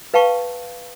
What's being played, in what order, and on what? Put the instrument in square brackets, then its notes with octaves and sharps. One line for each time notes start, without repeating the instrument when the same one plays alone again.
[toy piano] B4 F5 G5 A5 C#6